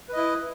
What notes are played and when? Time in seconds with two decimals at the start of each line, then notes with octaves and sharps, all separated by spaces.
0.09 B4
0.13 D#5
0.17 E4